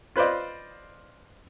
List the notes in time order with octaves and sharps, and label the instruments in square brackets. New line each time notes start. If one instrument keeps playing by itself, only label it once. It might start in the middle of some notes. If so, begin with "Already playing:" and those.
[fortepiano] F4 B4 C5 D5 D#5